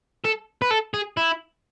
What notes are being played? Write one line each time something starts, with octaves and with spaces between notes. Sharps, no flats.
A4
B4
A4
G#4
E4